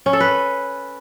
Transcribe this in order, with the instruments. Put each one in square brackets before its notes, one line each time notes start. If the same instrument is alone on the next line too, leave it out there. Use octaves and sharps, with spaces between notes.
[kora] C#4
A4
B4